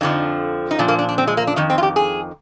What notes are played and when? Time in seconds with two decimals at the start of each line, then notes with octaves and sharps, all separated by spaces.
0.01 F2 D3 F3 D#4
0.71 D#4
0.79 A#2 F3 D4
0.88 A#3
0.99 D4
1.09 D4
1.18 C4
1.28 G#3
1.37 A#3
1.47 D4
1.56 F2 D#3 D#4
1.70 C4
1.78 F4
1.83 G4
1.96 G#4